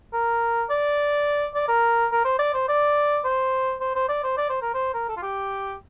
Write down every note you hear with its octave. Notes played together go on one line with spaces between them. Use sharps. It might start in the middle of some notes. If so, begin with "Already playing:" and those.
A#4
D5
D5
A#4
A#4
C5
D5
C5
D5
C5
C5
C5
D5
C5
D5
C5
A#4
C5
A#4
A4
F4
G4